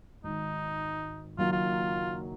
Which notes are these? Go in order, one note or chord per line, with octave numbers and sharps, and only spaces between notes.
G#1 G#2 D#3 D#4
F#1 F#2 D#3 F#3 A#3 F4
F4